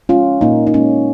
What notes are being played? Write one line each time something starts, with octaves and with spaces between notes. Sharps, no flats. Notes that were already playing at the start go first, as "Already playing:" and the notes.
G#3 C#4 F4
A#2 A#3 D#4
D#4
G#3 C#4